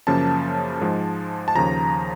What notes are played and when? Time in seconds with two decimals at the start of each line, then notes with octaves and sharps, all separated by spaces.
0.07 F#2 C#3 F3 A#3 A5
0.81 G#2 F3 G#3
1.48 A5
1.55 D#2 C#3 F3 A#5